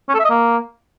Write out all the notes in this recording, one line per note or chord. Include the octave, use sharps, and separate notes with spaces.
C#4
A4
E5
D#5
A#3